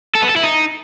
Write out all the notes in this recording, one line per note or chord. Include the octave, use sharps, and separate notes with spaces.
A4
B3
A4
E4
D#4